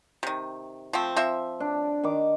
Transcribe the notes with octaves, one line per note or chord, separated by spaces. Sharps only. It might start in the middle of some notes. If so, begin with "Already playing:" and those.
C3 D#3
F3 A3 C4
F3 C4 E5
D4
D#3 D6